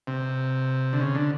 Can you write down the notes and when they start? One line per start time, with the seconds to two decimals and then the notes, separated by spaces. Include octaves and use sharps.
0.07 C3
0.93 D3
1.00 C#3
1.15 D3